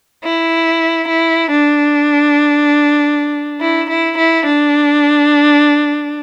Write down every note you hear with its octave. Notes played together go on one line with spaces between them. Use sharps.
E4
E4
D4
E4
E4
E4
D4